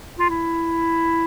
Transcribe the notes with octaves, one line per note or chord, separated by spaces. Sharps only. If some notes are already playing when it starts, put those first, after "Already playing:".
F4
E4